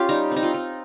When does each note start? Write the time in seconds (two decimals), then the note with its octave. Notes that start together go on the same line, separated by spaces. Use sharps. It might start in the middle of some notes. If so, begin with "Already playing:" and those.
Already playing: C#4 F4 G4
0.09 G3 D#4
0.31 C4 D#4
0.43 F4
0.54 D#4